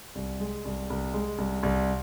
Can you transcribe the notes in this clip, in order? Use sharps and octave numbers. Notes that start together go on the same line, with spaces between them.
C2
G#3
C2
C2
G#3
C2
C2